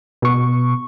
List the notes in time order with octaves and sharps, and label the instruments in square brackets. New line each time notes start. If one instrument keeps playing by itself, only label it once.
[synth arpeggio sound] B2 C#6